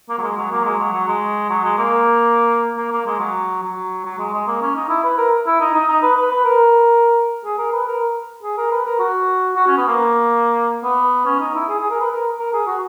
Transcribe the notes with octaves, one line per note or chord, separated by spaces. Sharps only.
A#3
F#3
G#3
F#3
A#3
F#3
G#3
F#3
F#3
G#3
F#3
G#3
A#3
A#3
A#3
G#3
F#3
F#3
F#3
G#3
G#3
A#3
C#4
D#4
E4
B4
A#4
E4
D#4
D#4
D#4
B4
B4
B4
A#4
G#4
A#4
B4
A#4
G#4
A#4
B4
A#4
F#4
F#4
C#4
B3
A#3
B3
C#4
D#4
E4
G#4
G#4
A#4
B4
A#4
A#4
G#4
F#4